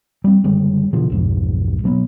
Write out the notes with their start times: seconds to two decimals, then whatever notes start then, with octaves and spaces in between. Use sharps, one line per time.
0.24 G3 C4
0.44 F#1 D3 G3 G#3
0.93 B2 D3 E3 F3
1.10 B1 F2 G#2
1.84 B2 F#3 A#3 B3